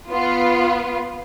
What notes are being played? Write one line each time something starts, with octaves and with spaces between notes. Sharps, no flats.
B3 F4